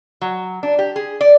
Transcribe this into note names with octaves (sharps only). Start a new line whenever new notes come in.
F#3
D4
G4
G#4
D5